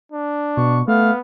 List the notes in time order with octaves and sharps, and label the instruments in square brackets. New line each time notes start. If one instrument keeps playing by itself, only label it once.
[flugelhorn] D4
[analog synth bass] B2 [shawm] C#6
[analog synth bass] A3 [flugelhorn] B3 [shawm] F5